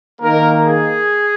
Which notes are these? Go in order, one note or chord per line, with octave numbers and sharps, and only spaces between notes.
D#3 A#3 A#4
G#4